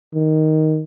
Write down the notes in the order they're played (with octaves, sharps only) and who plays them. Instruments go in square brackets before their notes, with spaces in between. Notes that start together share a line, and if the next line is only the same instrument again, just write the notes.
[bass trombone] D#3